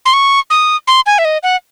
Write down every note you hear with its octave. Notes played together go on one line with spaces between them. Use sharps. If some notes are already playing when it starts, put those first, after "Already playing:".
C6
C#6
D#6
C6
G#5
E5
D#5
F#5